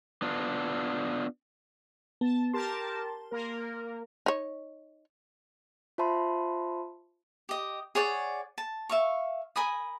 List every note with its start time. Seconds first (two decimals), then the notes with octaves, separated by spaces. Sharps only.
0.22 B3 D4 F4
2.21 B3 A5
2.54 G4 A#4 A5 C6
3.31 A#3 A#4
4.26 D#4 C#5
5.98 F4 C5 E5 A5 B5 C6
7.49 G4 D#5
7.95 G#4 C#5 D5 F#5
8.58 A5
8.89 E5 F5 C#6
9.56 A#4 G#5 B5 D#6